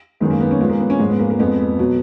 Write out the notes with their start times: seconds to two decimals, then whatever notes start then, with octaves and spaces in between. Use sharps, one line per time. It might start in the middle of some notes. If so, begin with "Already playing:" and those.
0.20 F#2 D#3 G#3 B3
0.30 A#3
0.41 B3
0.51 C#4
0.61 A#2 F3 G#3 B3
0.70 A#3
0.80 B3
0.90 C#4
0.99 G#2 F3 G#3
1.10 B3
1.19 A#3
1.30 A#3
1.39 F2 F3 G#3 B3
1.79 B2 F#3